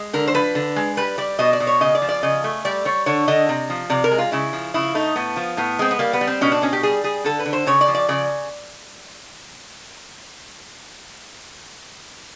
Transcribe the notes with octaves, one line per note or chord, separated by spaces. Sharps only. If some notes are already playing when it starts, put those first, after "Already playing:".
Already playing: G#3
D3 A#4
C5
F3 B4
D3
G#3
G3 B4
G3 D5
B2 D#5
D5
B2
C#5
C#3 D#5
D5
F3
D5
C#3 D#5
A3
G3 D5
G3 C#5
D3 C#5
D3 D#5
C3
F3
C3 D5
A#4
G#3
F4
C#3 E4
F3
C#3 E4
A3 D#4
A2 B3
F3
A2 B3
G#3 C4
B3
G3 A#3
B3
G3
C4
B2 C#4
D4
B2 C#4
G4
G3 G#4
G3 G#4
D3 A4
B4
D3
C5
C#3 C#5
D5
F3
D5
C#3 D5